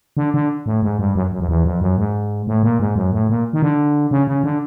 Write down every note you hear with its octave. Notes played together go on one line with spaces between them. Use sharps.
D3
D3
A2
G#2
G2
F#2
F#2
F2
E2
F2
F#2
G#2
A2
A#2
G#2
F#2
A2
A#2
D#3
D3
C#3
C#3
D3